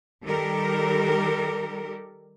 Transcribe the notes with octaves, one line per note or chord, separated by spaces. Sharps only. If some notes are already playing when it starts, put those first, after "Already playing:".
D#3 G3 G4 A4 A#4